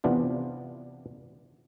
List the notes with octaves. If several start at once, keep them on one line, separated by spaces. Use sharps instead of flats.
C3 E3 B3 D4 F4